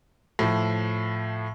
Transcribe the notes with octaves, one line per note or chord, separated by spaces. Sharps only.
A2 F3